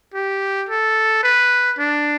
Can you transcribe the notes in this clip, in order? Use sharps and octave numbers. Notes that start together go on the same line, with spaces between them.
G4
A4
B4
D4